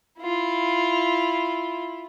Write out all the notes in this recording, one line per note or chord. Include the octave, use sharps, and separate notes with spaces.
E4 F4